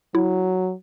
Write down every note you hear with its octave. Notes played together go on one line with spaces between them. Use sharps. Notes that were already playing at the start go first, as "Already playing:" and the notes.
F#3 E4